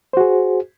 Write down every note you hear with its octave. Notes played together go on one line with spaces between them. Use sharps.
F#4 G#4 C5